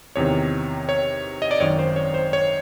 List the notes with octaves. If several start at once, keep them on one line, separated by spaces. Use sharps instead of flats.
E2 C3 D#3 C#5
C#5
D#5
D5
G#1 F#2 D#3 C#5
C5
C#5
C5
C#5